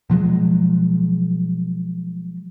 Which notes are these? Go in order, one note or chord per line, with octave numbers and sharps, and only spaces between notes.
B2 F3 F#3 G#3